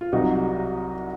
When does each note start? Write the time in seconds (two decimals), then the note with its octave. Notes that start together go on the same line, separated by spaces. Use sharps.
0.01 F4
0.12 C2 C3 F#3 D#4 F#4